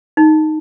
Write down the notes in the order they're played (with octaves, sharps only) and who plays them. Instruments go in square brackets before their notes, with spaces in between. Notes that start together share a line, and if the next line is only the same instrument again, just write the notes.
[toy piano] D#4